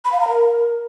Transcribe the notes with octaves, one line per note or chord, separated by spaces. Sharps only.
B5
F5
A#5
A#4